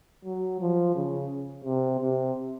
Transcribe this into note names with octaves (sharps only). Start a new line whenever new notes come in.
F#3
F3
C#3
C3
C3